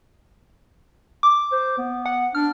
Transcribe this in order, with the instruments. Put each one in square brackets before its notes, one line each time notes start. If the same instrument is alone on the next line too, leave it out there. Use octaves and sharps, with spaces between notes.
[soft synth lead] D6
[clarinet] C5
B3
[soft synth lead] F#5
[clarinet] D4 [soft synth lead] F6